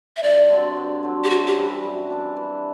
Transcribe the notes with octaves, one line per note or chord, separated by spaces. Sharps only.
E5
G2 D5
D3 F#3 C4
G2
D3 F#3 C4
G4
F#2 F#4
G4
E3 G3 D4
F#2
E3 G3 D4
E3